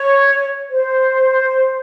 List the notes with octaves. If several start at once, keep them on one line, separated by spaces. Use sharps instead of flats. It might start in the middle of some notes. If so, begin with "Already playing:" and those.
Already playing: C#5
C5